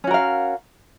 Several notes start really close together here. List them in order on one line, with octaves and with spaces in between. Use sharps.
C#4 F#4 A#4 F5